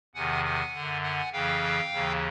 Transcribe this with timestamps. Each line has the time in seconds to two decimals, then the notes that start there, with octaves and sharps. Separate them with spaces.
0.15 E2 C3 D#3 F#5 G#5
0.45 F#5 G#5
0.74 F#2 D3
1.03 F#5 G#5
1.33 F2 C#3 E3 F5 G5
1.92 D#2 C#3 E3